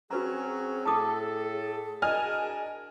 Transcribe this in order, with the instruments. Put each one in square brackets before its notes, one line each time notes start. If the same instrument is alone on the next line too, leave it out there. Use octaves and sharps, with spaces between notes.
[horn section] F#3 C4 C#4 [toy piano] F#4 B4 A#5 [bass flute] G#4
[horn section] A2 A4 [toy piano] A5 D6 D#6
[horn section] D4 F#4 A#4 [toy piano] D5 [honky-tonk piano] D#5 G#5 F6